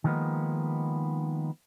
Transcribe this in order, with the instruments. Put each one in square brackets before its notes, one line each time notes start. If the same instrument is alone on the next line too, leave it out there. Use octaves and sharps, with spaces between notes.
[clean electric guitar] D#3 F3 G#3 A#3 B3 D#4